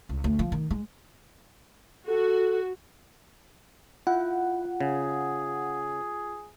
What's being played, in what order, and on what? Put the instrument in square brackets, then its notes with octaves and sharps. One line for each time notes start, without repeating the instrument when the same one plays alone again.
[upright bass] C#2
D2
F3
D#3
G#3
[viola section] F#4 [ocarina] A4
[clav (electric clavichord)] E4 [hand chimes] F4 [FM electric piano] F#5
[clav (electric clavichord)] C#3 [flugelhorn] G#4